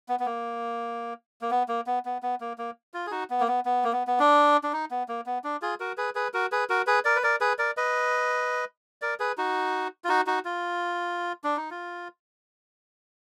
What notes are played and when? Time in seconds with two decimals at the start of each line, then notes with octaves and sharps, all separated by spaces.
0.09 B3
0.20 B3
0.26 A#3
1.41 A#3
1.51 B3
1.68 A#3
1.86 B3
2.05 B3
2.23 B3
2.40 A#3
2.58 A#3
2.94 F4
3.07 G#4
3.11 D#4 F#4
3.30 B3
3.40 A#3
3.48 B3
3.65 B3
3.84 A#3
3.92 B3
4.07 B3
4.19 D4
4.63 D4
4.73 D#4
4.91 B3
5.08 A#3
5.26 B3
5.44 D4
5.62 F4 G#4
5.80 F#4 A#4
5.97 G#4 B4
6.15 G#4 B4
6.34 F#4 A#4
6.52 G#4 B4
6.69 F#4 A#4
6.87 G#4 B4
7.05 A#4 D5
7.16 B4
7.23 A#4 D5
7.41 G#4 B4
7.59 A#4 D5
7.77 B4 D#5
9.02 A#4 D5
9.20 G#4 B4
9.38 D#4 F#4
10.04 F4
10.09 D#4 F#4
10.27 D#4 F#4
10.45 F4
11.44 D4
11.57 D#4
11.70 F4